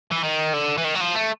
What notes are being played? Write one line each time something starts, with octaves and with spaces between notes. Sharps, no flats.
E3
D#3
D3
E3
D#3
F#3
F3
A3